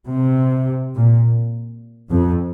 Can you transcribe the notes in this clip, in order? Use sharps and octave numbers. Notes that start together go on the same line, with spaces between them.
C3
A#2
F2